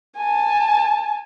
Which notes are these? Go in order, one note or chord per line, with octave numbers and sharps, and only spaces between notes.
G#5 A5